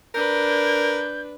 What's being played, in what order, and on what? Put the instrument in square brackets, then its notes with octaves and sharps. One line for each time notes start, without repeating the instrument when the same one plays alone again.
[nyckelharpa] D4 B4 [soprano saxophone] A#4 [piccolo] G6